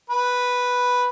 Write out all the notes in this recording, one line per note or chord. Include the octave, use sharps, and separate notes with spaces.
B4